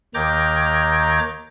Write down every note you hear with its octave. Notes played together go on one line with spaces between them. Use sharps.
D#2 D#3 A#5 D6 G6 G#6